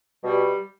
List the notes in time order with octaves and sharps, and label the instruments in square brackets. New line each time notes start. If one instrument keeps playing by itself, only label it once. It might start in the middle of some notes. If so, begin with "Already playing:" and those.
[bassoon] B2 [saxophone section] G3